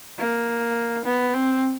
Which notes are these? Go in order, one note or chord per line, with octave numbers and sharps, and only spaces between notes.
A#3
B3
C4